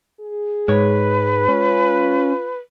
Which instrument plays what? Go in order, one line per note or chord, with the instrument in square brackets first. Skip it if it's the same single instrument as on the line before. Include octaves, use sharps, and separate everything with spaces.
[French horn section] G#4
[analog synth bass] G#2 [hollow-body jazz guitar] G#3 C#5 [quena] B4
[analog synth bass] C#4 [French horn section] F4